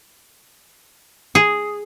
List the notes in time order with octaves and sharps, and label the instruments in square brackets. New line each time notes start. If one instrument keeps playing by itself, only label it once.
[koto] G#4